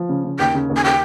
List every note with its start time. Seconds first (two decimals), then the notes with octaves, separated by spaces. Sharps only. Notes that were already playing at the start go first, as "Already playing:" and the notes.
Already playing: F3
0.09 C#3
0.24 C#3
0.39 D#2 G5
0.55 C#3
0.70 D#2
0.77 G#5
0.85 G5